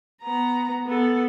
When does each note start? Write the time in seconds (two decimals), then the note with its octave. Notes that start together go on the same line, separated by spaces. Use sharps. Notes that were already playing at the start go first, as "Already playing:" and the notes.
0.23 B3 A#5
0.86 B3 A4